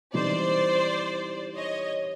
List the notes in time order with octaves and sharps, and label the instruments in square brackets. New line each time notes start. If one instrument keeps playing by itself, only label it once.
[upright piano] E3 G3 C4 D#4 [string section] C5 D5
[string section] C#5 D#5